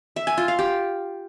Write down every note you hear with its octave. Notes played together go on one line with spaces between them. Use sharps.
E5
G#5
F4
F5
G4